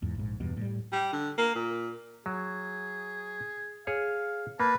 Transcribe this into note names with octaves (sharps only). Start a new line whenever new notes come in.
E2 G#2
A#1 G#2
E2 G2 B2
A2 F3 G3
G3
D3
A#3
A#2
F#3 G#4
G#4 C#5 F5
A#3 B4 A5